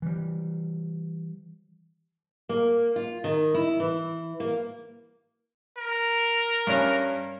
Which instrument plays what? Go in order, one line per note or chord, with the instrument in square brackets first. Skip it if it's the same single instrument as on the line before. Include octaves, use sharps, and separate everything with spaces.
[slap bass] E3 G3
[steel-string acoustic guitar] A#3
F4
D#3
E4
E3
A#3
[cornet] A#4
[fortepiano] G2 C#4